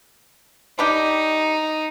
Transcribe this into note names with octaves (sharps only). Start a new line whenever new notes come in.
G3 D4 D#4 G4